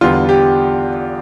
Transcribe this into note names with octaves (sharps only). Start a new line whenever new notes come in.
E2 D3 G3 B3 F4
G4